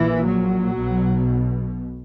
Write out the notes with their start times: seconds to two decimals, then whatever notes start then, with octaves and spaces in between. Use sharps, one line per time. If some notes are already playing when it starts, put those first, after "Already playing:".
Already playing: A#1 A#2 E3
0.24 F#3
0.76 B1 B2